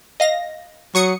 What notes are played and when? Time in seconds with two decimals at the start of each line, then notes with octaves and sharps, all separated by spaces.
0.20 D#5 F5 A#6
0.95 F#3 C#6 D#6 C#7